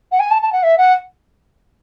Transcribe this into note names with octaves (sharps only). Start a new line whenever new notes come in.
F#5
G#5
A5
A5
F#5
E5
F#5